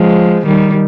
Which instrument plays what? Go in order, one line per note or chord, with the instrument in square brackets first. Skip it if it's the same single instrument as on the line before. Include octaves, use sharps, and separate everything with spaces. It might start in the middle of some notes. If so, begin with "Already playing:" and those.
Already playing: [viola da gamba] F3 G#3
D#3 G3